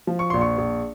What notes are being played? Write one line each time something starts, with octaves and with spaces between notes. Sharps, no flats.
F3
C#6
A#1 C6
C#6
A#1